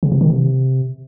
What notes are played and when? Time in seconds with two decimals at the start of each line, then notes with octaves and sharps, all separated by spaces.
0.03 C#3
0.12 C3
0.21 D#3
0.30 C3